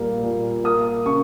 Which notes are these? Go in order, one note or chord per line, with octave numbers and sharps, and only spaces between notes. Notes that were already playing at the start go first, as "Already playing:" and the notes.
Already playing: A#2 G3 A#3
A#2
A#3 D#6
C#3 C#6